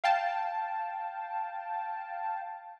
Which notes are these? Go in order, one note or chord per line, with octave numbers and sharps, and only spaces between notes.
F5 G5 A5